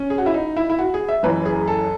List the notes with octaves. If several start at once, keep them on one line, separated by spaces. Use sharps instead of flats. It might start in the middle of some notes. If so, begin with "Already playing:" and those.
Already playing: C#4
G#4
F#4
E4
D#4
E4
E4
F#4
G#4
E5
F#1 F#2 E3 B4
G#4
A4